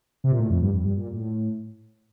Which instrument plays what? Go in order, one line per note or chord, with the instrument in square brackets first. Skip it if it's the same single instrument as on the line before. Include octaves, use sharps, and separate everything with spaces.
[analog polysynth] C3
A#2
A2
F2
G2
F2
G2
A#2
A2